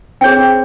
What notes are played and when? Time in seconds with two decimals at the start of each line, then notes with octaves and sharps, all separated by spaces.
0.21 C4 G#4 C#5 G5